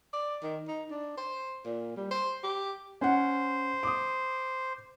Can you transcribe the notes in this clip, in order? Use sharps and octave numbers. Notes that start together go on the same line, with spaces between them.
D5
D#3
D#4
D4
C5
A#2
G3
C5
G4
C#4 C5 F#5
D6 D#6